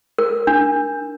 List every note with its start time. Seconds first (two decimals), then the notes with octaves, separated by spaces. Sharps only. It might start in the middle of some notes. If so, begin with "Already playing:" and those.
0.18 A#4
0.47 D4